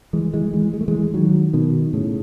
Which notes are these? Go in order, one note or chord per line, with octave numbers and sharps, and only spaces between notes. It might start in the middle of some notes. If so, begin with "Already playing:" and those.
E3 G#3
E3 G#3
E3 G#3
G#3
A3
E3 G#3
D#3 F#3
B2 D#3
A2 C#3